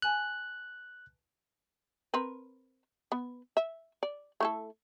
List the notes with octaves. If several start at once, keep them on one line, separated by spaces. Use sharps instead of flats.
B4 G#5 A5 F#6
C4 A#4 B4
B3
E5
D5
A3 E4 A4